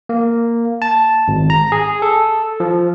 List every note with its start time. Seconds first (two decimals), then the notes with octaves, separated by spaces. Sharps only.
0.09 A#3
0.82 A5
1.28 G#1
1.50 A#5
1.72 G#4
2.02 A4
2.60 F3